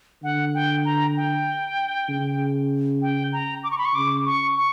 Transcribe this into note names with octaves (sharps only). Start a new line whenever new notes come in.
D3 F#5
G5
A#5
G5
C#3
G5
A#5
D6
C#6
B5
C#6
C#3 D6
C#6
C#6